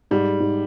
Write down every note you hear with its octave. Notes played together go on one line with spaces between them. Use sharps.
G#2 G3
G#2